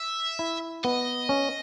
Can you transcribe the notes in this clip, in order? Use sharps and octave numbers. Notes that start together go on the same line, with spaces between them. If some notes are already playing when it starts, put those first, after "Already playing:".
Already playing: E5
E4
B3 D#5
C#4